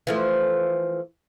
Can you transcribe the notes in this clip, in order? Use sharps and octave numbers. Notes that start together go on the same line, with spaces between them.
E3 F3 A3